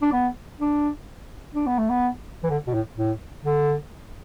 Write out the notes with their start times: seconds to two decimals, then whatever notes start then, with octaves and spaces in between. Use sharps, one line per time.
0.02 D4
0.13 B3
0.61 D4
1.55 D4
1.67 B3
1.78 A3
1.90 B3
2.44 E3
2.50 D3
2.67 B2
2.74 A2
2.97 A2
3.44 D3